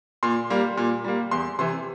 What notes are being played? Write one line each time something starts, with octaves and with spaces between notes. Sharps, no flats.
A#2 C6
G3 A#3
A#2
G3 A#3
E2 C6
C3 E3 C6